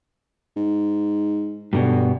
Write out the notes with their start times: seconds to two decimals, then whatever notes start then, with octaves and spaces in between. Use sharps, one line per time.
0.57 G#2
1.73 G2 B2 D3